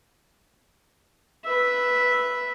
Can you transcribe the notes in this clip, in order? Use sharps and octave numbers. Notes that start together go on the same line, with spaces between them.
B4 E5